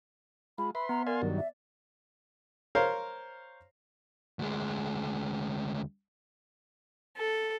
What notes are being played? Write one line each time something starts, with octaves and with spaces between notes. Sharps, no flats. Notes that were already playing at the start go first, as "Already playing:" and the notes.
G#3 F4 B5
B4 E5 B5 C6
B3 A#5
A#4 D5 F5 G#5 C6
G2 D#3 F#3
E5
A#4 C5 C#5 F5
D2 G#3
A4